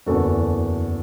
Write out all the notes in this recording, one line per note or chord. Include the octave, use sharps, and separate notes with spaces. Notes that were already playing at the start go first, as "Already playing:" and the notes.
F#1 E2 D3 F#4 A4